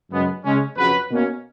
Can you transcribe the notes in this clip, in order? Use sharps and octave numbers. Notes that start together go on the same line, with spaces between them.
F#2 C#3 G#3 B3
C#3 G#3 C#4
F2 C#3 F#3 B4
B2 A#3 C#4